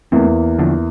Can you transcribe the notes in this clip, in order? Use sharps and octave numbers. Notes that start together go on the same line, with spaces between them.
E2 E3 A3 A#3 C4 E4
D3 F3